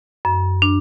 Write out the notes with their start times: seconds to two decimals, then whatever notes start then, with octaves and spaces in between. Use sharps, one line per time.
0.25 F#2
0.62 D4